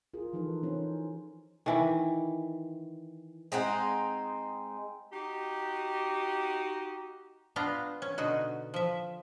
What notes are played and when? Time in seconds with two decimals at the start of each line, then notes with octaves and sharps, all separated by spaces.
0.14 F4 G#4 A#4
0.33 E3 F3 D#4 A4 B4
0.63 E3 C#4 D#4 C5
1.66 D#3 E3 E4
3.52 G#3 C4 D#4 F#5
5.12 D#4 F#4 G4
7.56 B3 D4 F4 F5 G5 A#5
8.02 C#4
8.18 B2 D3 D#4 F#4
8.74 F3 E5